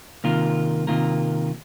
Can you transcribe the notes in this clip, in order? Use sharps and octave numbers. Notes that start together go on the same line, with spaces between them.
C3 D#3 A#3 F4 A#4
C3 D#3 A#3 F4 A#4